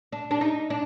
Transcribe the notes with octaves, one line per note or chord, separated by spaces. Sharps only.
D4
D4
D#4
D4